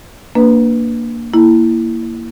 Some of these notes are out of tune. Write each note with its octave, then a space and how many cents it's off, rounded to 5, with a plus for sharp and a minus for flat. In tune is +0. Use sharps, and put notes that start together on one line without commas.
A#3 +0 D4 +0 B4 +0
A#3 +0 E4 +0